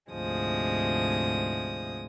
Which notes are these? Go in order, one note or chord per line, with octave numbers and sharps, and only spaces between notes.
D2 G#2 C3 F3 G#3 D#6